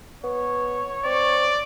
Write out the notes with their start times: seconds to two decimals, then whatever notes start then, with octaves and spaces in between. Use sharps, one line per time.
0.24 B3 C#5
1.05 C4 D5